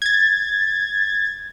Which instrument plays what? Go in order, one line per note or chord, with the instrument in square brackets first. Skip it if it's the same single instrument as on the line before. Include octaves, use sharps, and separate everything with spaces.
[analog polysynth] G#6 A6